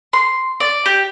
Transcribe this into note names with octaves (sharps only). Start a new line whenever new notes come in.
C6
D5
G4